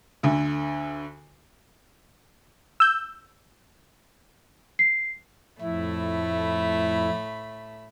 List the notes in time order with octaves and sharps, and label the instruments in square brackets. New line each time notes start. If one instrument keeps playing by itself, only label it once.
[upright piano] D2 D3
[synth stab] E6 G6
[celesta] C7
[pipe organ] F2 E4 [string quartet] A2 A3 B5